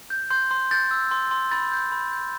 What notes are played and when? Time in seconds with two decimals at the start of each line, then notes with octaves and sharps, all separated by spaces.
0.10 G6
0.30 C6 G6
0.51 C6
0.71 G6 A6
0.91 E6
1.11 C6
1.31 C6
1.51 B5 A6
1.72 G6
1.92 B5
2.12 G6